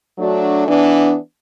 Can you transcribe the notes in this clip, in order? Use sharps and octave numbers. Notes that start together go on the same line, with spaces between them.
F#3 A3 D4 F#4
E3 B3 D4